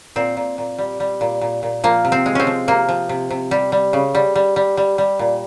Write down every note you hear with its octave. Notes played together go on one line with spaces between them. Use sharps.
A#2 C4
A#2
A#2
G3
G3
A#2
A#2
A#2
F3 A#3
C3
C4
G#3
C4 C#4
F3
C3 A#3
F3
C3
C3
G3
G3
C#3
G3
G3
G3
G3
G3
A#2